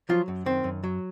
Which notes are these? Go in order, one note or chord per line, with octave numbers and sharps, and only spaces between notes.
F3 F#3 F4
F#2
D#3 C4
F#2
F#3